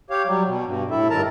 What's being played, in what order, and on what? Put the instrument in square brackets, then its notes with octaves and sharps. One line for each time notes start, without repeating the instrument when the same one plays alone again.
[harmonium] G4 C#5 F5
F#3 G3
B2
G2 B2
A2 E4 A4 E5
G2 D#3 A#4 A5 A#5